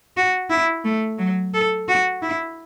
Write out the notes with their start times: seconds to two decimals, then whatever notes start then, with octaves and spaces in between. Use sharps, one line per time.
0.17 F#4
0.50 E4
0.84 A3
1.19 F#3
1.54 A4
1.88 F#4
2.22 E4